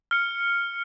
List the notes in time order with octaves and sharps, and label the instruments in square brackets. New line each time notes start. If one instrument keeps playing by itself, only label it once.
[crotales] F6 C#7